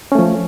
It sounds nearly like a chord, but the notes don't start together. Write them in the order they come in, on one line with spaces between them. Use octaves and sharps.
C#4 A3 F3